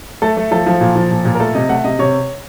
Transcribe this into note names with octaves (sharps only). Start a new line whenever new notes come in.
A3 A4
A3
F3 A4
F3
A#2
F3
A#2
A#2
A#4
A3 A4
C3 D#5
A3 F#5
C3 D#5
C3 C#5